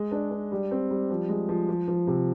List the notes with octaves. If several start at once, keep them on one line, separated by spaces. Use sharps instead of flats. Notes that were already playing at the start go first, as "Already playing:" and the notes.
Already playing: G#3
D4
D4
G3
C4
G3
F3
G#3
F3
F3
F3
C3